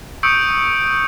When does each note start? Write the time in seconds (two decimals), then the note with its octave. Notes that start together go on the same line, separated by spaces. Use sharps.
0.23 C#6 D#6 E6 G6 C#7 D7